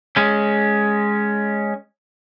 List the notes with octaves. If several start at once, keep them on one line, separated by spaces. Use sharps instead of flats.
G#3 C#4